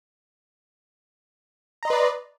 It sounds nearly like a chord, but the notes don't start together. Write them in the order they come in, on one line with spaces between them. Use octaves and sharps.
A#5 D#5 C6 B4 D5